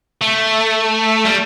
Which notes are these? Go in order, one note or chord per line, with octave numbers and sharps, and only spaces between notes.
A3
G3